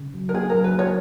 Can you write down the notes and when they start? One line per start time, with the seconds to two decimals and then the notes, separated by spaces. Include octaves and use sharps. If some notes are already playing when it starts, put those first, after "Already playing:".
Already playing: C#3
0.14 F#3
0.29 A#4
0.34 A#3 G#4
0.50 F#3 A#4
0.64 B4
0.75 A#3 C#5